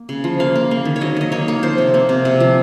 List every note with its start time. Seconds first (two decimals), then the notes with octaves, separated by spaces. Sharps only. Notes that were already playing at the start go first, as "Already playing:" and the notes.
Already playing: A#3
0.09 C#3
0.24 F3
0.40 A#3 F5
0.55 A#3
0.71 A#3
0.85 D#3
0.96 C#5
1.01 F#3 D#5
1.16 D#3 D#5
1.32 A#3 C#5
1.48 A#3
1.63 F3 C5
1.78 C3
1.94 A#3
2.09 C3
2.25 C3
2.40 F3